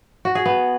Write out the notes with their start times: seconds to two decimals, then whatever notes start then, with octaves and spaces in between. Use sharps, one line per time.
0.25 F#4
0.35 G#4
0.46 B3